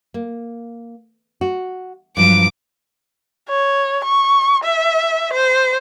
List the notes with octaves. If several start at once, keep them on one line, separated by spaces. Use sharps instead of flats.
A#3
F#4
G2 F3 F#3 D6 D7
C#5
C#6
E5
C5